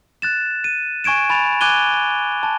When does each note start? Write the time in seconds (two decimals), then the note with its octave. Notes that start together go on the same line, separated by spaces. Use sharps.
0.22 F#6 A6 E7
0.64 D#7
1.04 G#5 C#6 G#6 D7 E7
1.29 G#5 B5 A6 F7
1.61 G#5 D6 F#6 G#6 D#7 G7
2.43 A5